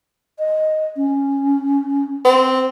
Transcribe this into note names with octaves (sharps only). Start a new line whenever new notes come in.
D#5
C#4
C4